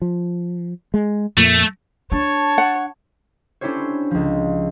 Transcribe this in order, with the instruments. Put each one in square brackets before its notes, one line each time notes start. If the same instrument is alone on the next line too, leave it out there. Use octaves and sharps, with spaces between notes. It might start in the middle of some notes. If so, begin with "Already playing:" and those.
[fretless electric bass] F3
G#3
[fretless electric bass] F2 A#2 A#3 [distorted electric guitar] A3
[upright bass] D4 [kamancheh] C#5 [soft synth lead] A5
[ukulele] F#5
[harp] C#4 D4 E4 G4 C5 C#5
C#2 F3